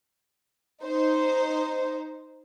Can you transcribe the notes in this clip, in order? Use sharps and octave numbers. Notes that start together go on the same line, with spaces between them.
D#4 C5